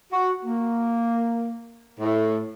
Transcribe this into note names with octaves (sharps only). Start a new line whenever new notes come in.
F#4
A#3
A2